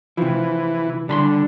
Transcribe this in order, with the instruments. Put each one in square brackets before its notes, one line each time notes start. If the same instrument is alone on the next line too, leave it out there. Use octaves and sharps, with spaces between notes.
[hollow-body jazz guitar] C3 F3 [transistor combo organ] E3
[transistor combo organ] D3 [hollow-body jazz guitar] G3 B5 C6